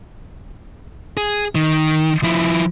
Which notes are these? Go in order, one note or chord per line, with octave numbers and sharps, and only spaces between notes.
G#4
D#3
F3 E4